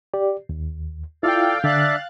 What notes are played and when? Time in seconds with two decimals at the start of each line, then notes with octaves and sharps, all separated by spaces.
0.14 G4 D5
0.49 D#2
1.23 E4 F4 A4 D5 F5 G5
1.64 D3 D4 D5 E5 F5 F#6 A6